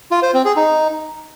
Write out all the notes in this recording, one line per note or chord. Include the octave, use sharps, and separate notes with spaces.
F4
C5
C4
G#4
D#4